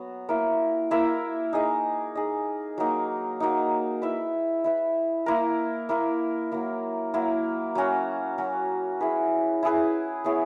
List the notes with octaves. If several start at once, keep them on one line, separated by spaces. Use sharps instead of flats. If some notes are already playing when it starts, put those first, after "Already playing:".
Already playing: F#3 B3 F#4
A#3 E4 A#4 E5
A#3 E4 A#4 E5
D#4 G#4 D#5
D#4 G#4 D#5
F#3 A#3 D#4
F#3 A#3 D#4
E4 B4 E5
E4 B4 E5
A#3 E4 A#4
A#3 E4 A#4
F#3 A#3 E4
F#3 A#3 E4
F#3 C#4 F#4
F#3 C#4 F#4
E4 G#4 B4
E4 G#4 B4
B3 E4 G#4 C#5